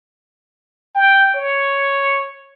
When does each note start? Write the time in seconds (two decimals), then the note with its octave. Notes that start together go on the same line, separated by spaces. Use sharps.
0.95 G5
1.34 C#5